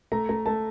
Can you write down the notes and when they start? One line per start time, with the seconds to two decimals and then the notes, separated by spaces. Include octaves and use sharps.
0.12 A3 A#5
0.29 A3 A#5
0.46 A3 A5